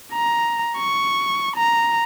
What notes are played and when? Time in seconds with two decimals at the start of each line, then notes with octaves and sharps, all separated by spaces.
0.13 A#5
0.78 C#6
1.56 A#5